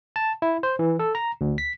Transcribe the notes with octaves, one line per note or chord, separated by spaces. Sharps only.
A5
E4
C5
E3
A4
A#5
D2
B6